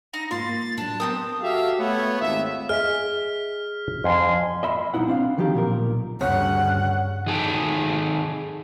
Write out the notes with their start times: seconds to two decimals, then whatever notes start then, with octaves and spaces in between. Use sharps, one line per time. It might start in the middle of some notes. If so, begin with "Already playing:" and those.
0.14 D#4 A#6
0.31 G#2 A#3 F4 C6 A6
0.49 A#3
0.78 A2 F#3 D4 A5
1.00 B3 C4 G4 A#4 D#6
1.42 F#4 G4 A4 E5 F5
1.79 A3 B3 C#5
2.20 G#1 D#2 F4 E5
2.69 G#4 D#5 E5 F6 B6
4.04 F2 G#5 C6
4.63 D#5 E5 B5 C6
4.94 B1 F#3 D#4 E4 F#5
5.07 C4 D4 F5
5.38 D3 D#3 F3 F#3 G4
5.55 B1 A#2 A#4
6.21 D2 G2 C#3 C#4 F#5
7.27 D#3 G#4 A4 G5